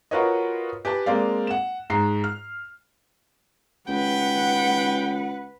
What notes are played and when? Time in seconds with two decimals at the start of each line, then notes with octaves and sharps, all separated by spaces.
0.11 F4 F#4 A#4 B4 C#5 D#5
0.85 G4 B4 G#5 A5
1.06 G#3 A#3 C4 D5 F5
1.47 F#5 E7
1.90 G#2 A#5 C7
2.24 F6
3.88 C#2 B4 F#5 G5